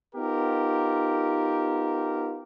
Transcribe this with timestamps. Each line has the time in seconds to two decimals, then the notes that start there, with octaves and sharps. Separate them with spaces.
0.15 B3 D#4 F4 G4 A#4